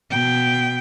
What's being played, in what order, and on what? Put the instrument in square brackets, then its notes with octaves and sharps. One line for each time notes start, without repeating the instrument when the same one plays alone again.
[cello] B2 G5